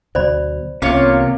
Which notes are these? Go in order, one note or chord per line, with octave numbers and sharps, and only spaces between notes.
D2 B2 F#3 C5 D5 B5
C2 C3 A#3 B3 C#4 F4 C#5